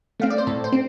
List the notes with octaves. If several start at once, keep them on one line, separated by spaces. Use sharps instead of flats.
A3 C4 F5
D5
C5
A2 A4
C5
C4